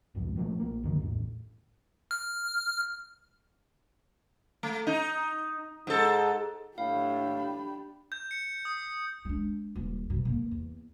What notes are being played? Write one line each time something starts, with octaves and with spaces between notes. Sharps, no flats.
G1 C2 F2 G#2
A#2 F3 G#3 A3
A#1 A#3
C2 F#2 D3 D#3
A#1 E2 A2
F6
A3
D#4
G#2 A4
A2 D4 G4 F5 B5
G6
C#7
D#6
G#3 D4
D#1
G2 B2
A3 A#3
E2